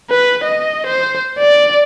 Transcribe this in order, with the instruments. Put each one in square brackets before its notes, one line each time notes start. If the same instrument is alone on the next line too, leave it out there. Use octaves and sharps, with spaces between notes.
[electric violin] B4
D#5
C5
D5